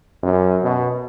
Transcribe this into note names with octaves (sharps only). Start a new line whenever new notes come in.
F#2
B2